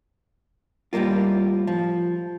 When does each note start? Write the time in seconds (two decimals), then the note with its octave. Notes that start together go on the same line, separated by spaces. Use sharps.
0.93 A2 G3 G#3 A#3 F4
1.67 F3